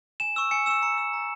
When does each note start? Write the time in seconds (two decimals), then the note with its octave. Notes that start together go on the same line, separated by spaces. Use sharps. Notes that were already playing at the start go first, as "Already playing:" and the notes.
0.20 G#5 E7
0.36 C#6 E6
0.51 G#5 C#7
0.66 C#6 E6 E7
0.82 A#5 C#7
0.98 E6
1.13 A#5